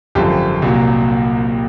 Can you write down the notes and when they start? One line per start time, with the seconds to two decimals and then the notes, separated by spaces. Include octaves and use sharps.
0.15 G#1 F#2 D3 F3 G4
0.62 C2 A#2 F#3